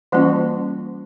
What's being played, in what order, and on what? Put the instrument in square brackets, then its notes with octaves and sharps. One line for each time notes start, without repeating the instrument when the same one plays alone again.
[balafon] E3 G3 A#3 C#4 F4